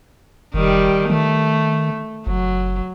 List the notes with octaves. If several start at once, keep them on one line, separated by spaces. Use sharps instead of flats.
F1 D#3 G3
D#3 A3
F#1 F#3